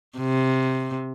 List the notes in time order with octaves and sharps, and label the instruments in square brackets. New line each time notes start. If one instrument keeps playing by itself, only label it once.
[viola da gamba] C3